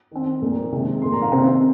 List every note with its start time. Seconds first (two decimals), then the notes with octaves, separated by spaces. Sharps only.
0.11 D#3 C4
0.42 A#2 A#3
0.72 C3 D#3 G#3 C4
1.02 A#2 A#3 C6
1.12 A#5
1.22 F5
1.32 C3 D#3 C4 C5